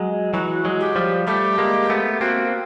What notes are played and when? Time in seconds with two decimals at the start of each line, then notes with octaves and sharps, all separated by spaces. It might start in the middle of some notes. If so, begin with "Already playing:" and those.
Already playing: F#3 G#3
0.34 E3 F#3 F#4
0.65 F#3 G#3
0.80 G4
0.96 F3 G3
1.27 G3 A3 G4
1.58 G#3 A#3
1.90 A3 B3
2.21 A#3 C4 F#4